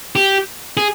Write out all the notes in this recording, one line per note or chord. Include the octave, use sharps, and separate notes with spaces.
G4
G#4